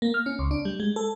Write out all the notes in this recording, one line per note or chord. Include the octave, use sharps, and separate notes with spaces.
A#3
F6
C#4
C#2
D4
G3
G#3
A4